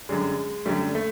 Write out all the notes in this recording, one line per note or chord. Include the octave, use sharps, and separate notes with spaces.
F#2 D3 G3 G#3
F#2 D3 G3 A3
A3